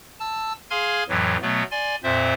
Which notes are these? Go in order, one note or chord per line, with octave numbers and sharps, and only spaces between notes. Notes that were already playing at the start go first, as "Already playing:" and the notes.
A5 E6
G#4 F5 G#5 C6 F6 G#6
F2 A2 E3 F#3
B2 F#3 A3 B3
D5 G#5 C6
F2 A#2 C4 C5 E5